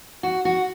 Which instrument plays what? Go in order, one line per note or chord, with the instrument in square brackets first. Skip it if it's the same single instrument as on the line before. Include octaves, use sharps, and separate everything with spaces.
[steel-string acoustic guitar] F#4
F#4